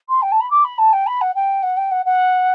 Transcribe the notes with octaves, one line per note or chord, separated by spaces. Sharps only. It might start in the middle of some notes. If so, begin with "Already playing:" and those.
C6
G5
A5
B5
D6
B5
A5
G5
B5
F#5
G5
F#5
G5
F#5
F#5